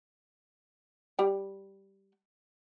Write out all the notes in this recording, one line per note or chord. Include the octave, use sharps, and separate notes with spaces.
G3 G5